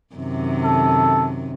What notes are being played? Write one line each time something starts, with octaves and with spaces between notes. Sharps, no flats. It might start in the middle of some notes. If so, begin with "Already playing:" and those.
F#2 C3 D#3
A4